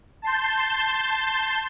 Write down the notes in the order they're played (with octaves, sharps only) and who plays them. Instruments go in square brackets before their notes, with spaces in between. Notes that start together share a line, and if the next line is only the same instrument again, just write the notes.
[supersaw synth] A5 C6 G6